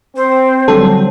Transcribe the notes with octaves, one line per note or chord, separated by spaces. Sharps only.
C4 C5
D3 F#3 G3 A4